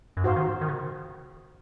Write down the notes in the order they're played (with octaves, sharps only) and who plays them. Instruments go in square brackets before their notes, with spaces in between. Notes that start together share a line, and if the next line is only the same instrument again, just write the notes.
[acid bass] F#2
[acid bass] G#2 [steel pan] F#4 C5 F5
[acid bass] D#3
D#3
C#3